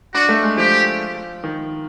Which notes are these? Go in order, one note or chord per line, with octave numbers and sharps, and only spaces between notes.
D4 F#4
A3
G#3
F3 G4
D#3